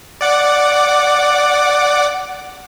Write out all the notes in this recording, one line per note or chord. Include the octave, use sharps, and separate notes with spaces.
D5 F#5 D6